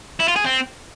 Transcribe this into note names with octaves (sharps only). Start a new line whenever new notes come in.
E4
F4
G#4
C4